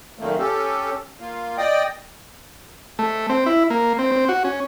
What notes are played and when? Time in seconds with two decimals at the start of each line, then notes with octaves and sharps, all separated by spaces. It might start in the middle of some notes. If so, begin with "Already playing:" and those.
0.19 F#2 A#2 D#3 A3 A#3
0.39 C#4 G4 A4
1.20 A#3 F4
1.58 D5 D#5 G5 D#6
2.99 A3
3.29 C4
3.46 E4
3.70 A#3
3.98 C4
4.12 C4
4.29 F#4
4.44 C#4